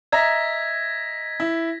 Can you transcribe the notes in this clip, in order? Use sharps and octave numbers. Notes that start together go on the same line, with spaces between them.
D#5 E5 A#5 G#6 A#6 B6
E4